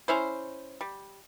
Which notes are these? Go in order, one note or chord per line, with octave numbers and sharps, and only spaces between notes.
C#4 E4 C5
G3